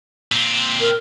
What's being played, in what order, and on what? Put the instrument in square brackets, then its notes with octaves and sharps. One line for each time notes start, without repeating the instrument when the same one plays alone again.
[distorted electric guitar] A#2 C4
[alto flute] A#4